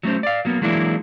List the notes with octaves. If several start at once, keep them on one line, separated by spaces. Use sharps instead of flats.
F#3 A3 C#4 C5
D5 F5
F#3 A#3 B3
E3 F#3 G#3 A#3 D4 E4